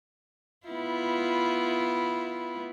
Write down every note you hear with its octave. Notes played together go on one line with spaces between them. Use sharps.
B3 E4 F4